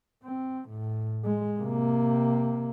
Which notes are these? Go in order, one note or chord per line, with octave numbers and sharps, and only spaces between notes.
C4
A2
G#3
C3 A#3